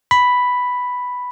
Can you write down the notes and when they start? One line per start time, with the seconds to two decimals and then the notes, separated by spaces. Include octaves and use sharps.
0.11 B5